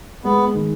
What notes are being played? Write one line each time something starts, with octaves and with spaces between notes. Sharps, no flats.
G#3 B3
D#3